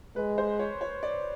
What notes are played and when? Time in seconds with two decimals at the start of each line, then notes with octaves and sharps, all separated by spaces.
0.16 G#3 B4
0.38 C5
0.59 C#5
0.81 C#5
1.03 D5